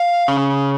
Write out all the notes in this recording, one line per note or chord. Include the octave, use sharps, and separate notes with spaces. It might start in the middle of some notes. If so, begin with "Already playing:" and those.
Already playing: F5
C#3